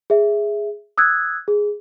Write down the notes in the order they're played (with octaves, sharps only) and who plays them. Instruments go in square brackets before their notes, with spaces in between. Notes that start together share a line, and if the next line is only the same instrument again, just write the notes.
[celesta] G#4 E5
D#6 E6 F#6 G#6
G#4